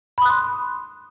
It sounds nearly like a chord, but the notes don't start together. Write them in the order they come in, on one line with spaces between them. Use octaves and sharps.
B5 D#6 F#6 C6